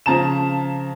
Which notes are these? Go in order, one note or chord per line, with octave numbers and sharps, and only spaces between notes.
C#3 F3 A5 A#5 E7